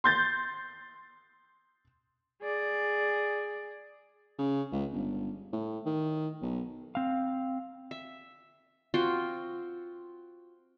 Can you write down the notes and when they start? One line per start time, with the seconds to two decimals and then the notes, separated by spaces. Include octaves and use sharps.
0.04 C6 G6 A6
2.42 G#4 D5
4.38 C#3
4.72 C#2
4.93 G1
5.53 A2
5.86 D#3
6.42 B1
6.95 C4 F5
7.91 E5
8.94 C4 F4 F#4 G5